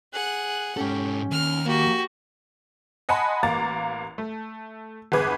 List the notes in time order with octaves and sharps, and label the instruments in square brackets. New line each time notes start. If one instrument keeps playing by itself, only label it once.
[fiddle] G#4 F#5 [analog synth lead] F#6
[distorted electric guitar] G#2 A4 [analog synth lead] C#4 [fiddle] G4
[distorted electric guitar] D#2 [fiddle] F6
[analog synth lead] A#3 [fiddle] F#4 G4
[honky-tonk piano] D#5 F#5 G#5 A5 B5 C6
A1 A#3 A#5 D6 A6
A3
G1 E2 G#4 B4 D6 G#6